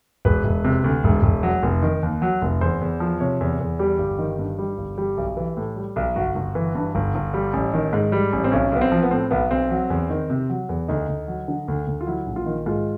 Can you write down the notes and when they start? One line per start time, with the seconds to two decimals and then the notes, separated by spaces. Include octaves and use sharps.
0.25 E1 B4
0.44 E1
0.64 C3
0.84 D2
1.04 E1
1.23 E1
1.43 F#3
1.63 F1
1.83 D#3
2.03 D#2
2.22 F#3
2.41 F1
2.61 E2 C5
2.81 E2
3.00 F3
3.20 C3 C#5
3.41 E2
3.60 E2
3.79 G3 G4
3.99 G1
4.19 D#3
4.39 G2
4.58 G3
4.78 G1
4.98 G3 G4
5.17 B1
5.37 E3
5.57 A2
5.76 G3
5.96 B1
6.16 G1 F#4
6.35 G1
6.55 E3
6.75 G2
6.95 G1
7.15 G1
7.34 G3
7.53 A1
7.74 D#3
7.93 G#2
8.12 G3
8.33 A1
8.44 C4
8.52 B1 C#4
8.72 B1 B3
8.81 C4
8.92 F3
9.03 B3
9.11 A2 C4
9.31 B1 B3
9.51 B1 C4
9.70 F#3
9.90 E2
10.10 D#3
10.30 C3
10.49 F#3
10.69 E2
10.88 D2 D#4
11.08 D2
11.28 F#3
11.48 D3
11.68 D2
11.87 D2
12.01 F4
12.07 F#3 E4
12.26 A#1
12.36 F4
12.46 D#3
12.66 G#2 F4